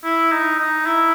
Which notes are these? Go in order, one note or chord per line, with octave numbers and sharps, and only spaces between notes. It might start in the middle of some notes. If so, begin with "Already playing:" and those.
E4
D#4
D#4
E4